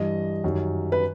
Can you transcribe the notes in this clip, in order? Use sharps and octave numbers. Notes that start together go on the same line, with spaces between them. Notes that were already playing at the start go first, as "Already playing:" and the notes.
Already playing: G2 E3 G3 D#5
F#2 D#3 G3
B4